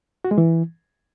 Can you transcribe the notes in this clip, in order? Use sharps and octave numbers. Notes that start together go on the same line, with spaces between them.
F#4
G#3
E3